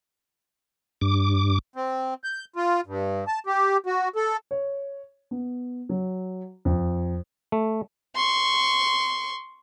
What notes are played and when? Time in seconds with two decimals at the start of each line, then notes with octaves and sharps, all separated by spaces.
1.01 G2 D6
1.76 C4
2.24 G6
2.56 F4
2.86 G2
3.27 A5
3.47 G4
3.86 F#4
4.16 A4
4.51 C#5
5.31 B3
5.89 F#3
6.65 F2
7.52 A3
8.16 C6 C#6